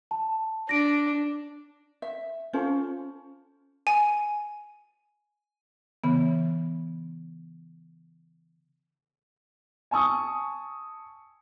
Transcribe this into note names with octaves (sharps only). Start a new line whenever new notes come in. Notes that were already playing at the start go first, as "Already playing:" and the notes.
A5
D4 A#6 D7
E5
C#4 F4 A4 C5
G#5
C#3 E3 B3
G#5 A5 C#6 D#6 E6